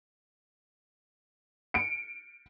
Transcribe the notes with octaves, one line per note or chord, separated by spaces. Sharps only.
C#7 D7